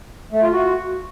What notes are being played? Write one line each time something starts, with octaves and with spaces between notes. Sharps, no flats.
A3
F4
F#4